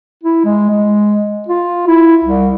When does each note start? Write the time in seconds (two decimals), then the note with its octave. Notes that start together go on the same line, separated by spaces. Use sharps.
0.24 E4
0.45 G#3
0.70 G#3
1.48 F4
1.87 E4
2.24 C2